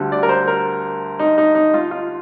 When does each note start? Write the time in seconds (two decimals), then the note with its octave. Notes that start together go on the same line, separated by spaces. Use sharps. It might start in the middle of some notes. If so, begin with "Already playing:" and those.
Already playing: D2 D3 G3
0.12 D5
0.23 A#4
0.29 C5
0.48 A#4
1.19 D#4
1.38 D#4
1.55 D#4
1.74 F4
1.91 F4